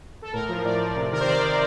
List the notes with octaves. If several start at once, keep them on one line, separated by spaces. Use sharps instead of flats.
A4
A2 A#4
F3
A2 D5
F3
C3
D#3 A#4
C5
C3 D5
D#3